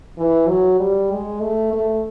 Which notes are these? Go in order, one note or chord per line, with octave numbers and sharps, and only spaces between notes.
E3
F#3
G3
G#3
A3
A3